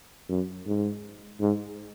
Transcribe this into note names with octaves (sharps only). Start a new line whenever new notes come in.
F#2
G#2
G#2